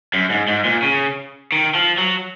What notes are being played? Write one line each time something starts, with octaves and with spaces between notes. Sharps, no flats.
F#2
G#2
G#2
A#2
C#3
D#3
F3
F#3